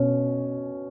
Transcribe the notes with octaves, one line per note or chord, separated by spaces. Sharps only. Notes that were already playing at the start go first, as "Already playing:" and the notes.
Already playing: B2 C#4